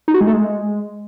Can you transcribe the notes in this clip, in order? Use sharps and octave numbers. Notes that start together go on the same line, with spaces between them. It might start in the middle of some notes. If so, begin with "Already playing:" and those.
D#4
F#4
G#3
A3
G#3